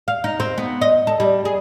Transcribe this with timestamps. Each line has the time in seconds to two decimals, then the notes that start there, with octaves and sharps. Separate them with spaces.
0.08 F5
0.24 D#4
0.40 C4
0.58 B3
0.82 D#5
1.07 A4
1.20 G3
1.45 G#4